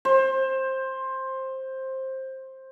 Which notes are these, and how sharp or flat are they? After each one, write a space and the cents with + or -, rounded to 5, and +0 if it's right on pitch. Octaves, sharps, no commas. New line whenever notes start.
C5 +15